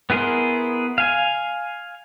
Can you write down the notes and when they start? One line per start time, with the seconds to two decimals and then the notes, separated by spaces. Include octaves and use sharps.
0.10 B3 E4 G#4 A#4 C6
0.98 F5 G#5